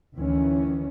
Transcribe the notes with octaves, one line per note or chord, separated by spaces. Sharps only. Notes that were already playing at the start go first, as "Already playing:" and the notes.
D2 D#3 E3 C#4